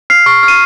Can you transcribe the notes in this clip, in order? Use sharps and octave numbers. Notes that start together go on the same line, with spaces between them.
F6 C7
C#6
F6
D#7